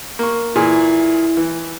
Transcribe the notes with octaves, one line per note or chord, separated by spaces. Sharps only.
A#3 C#6
A#2 E3 E4 G#4
E3